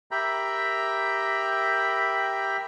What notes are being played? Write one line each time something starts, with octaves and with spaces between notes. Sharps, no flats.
G4 A#4 E5 G5 A#5 B5